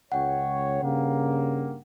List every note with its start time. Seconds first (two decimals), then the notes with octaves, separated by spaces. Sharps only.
0.12 C#2 C#5 F#5 G5
0.82 G2 C#3 A#3